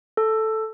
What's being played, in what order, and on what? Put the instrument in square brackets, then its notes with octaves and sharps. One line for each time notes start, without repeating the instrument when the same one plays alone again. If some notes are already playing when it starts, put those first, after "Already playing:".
[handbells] A4